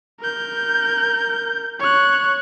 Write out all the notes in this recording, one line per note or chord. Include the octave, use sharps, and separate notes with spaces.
A#4 G6
C#5 F#6